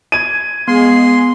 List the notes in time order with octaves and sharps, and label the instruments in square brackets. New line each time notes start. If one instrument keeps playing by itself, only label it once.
[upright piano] G#6 D#7
[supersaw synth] G#3 G#4 [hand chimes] B3 [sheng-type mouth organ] C6